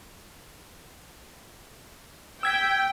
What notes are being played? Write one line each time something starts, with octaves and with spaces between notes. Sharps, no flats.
G5 E6 G#6 B6